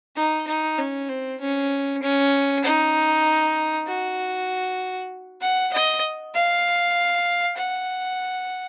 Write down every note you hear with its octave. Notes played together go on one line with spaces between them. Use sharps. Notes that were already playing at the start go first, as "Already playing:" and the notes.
D#4
D#4
C#4
C4
C#4
C#4
D#4
F#4
F#5
D#5
F5
F#5